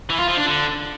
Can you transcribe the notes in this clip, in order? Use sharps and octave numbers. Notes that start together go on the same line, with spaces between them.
E3
F4
F3
D4
D3